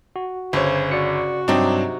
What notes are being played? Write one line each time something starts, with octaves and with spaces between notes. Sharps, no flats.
F#4
G1 C#3 C5 C#5
F#4 D5 C#7
G2 C3 F#3 G3 C4 D4 D#4